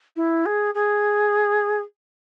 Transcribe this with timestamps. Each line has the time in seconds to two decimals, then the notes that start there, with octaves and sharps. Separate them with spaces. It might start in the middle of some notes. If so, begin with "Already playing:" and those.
0.16 E4
0.46 G#4
0.75 G#4